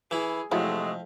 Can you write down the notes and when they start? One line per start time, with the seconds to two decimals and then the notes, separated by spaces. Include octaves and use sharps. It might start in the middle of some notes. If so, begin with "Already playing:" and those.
0.11 E3 E4 G#4
0.52 F2 C3 F#3 G#3 A3 E4 F#4